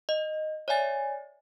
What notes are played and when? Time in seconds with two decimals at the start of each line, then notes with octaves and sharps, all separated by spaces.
0.09 D#5
0.68 C#5 D5 E5 G#5 A6